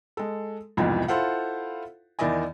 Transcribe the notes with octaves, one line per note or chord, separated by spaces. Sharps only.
G#3 A4
C2 F2 G#2 B2 E3 F3
E4 F4 A4 C5 F5 F#5
E2 D#3 E4 D5 D#5 G#5